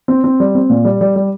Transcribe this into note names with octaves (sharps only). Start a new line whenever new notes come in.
C4
C4
G3
C4
A#2
G3
G3
G3